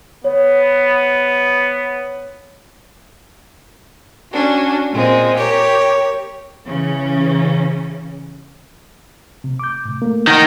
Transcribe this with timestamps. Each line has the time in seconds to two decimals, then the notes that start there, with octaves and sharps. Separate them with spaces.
0.24 B3 C#5
4.31 C#4 D4 F#4
4.91 A#2 G#3 C4
5.37 G4 A#4 C#5
6.65 C#3 E3 C#4
9.44 C3
9.59 D6 G6
9.85 A2 C3
10.02 A3 A#3
10.27 D#3 D#4 F#5 F6